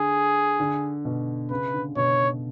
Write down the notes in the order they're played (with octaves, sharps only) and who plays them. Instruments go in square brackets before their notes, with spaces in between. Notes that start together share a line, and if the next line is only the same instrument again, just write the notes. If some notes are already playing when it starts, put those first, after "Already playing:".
Already playing: [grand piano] D3 [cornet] G#4
[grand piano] D3
B2
[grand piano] C#3 [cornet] B4
[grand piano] D3
[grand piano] B2 [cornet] C#5